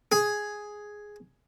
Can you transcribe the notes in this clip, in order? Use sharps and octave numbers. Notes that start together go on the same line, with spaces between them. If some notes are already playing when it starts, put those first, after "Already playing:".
G#4